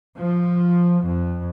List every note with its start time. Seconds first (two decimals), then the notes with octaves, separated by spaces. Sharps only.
0.18 F3
1.06 F2